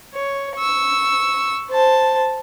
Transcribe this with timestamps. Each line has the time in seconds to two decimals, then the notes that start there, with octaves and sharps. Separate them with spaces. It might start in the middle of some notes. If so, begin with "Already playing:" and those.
0.14 C#5
0.56 C#6 E6
1.70 C5 A5